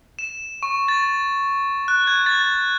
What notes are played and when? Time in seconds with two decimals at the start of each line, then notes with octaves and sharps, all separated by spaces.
0.19 E7
0.63 C#6
0.88 A6
1.88 F#6
2.07 G#6
2.26 A6